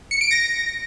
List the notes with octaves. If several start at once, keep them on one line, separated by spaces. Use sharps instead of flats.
C#7
D7
A#6